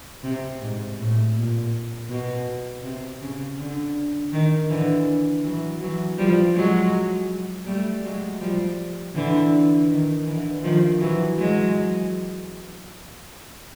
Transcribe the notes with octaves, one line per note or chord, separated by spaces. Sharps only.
C3
G#2
A2
A#2
B2
C3
C#3
D3
D#3
D3 E3
E3 F#3
E3 F#3
F3 G3
F#3 G#3
G3 A3
F#3 G#3
F3 G3
D3 E3
D#3
D3 E3
D#3 F3
E3 F#3
F#3 G#3